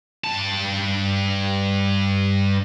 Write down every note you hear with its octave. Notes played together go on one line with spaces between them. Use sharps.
G2 A5